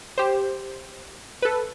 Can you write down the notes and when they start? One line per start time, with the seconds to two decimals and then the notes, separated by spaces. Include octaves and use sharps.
0.18 G4 C5
1.42 A4 B4